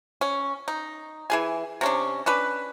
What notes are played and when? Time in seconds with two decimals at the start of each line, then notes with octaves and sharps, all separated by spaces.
0.21 C#4
0.68 D#4
1.30 E3 G#4 G#5
1.81 C3 C#4 D4
2.26 C#4 D4 B4